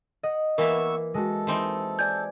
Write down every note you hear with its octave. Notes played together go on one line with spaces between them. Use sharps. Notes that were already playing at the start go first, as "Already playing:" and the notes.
D#5 F#5
E3 A#3 B3 A#4 E5 C#6 E6
G#3 F#4 A4
E3 C4 D#4
D5 G#5 G6 G#6